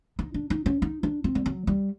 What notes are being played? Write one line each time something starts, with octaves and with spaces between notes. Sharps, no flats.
D#4
D4
D#4
C#4
D#4
D4
C4
G3
F#3
G3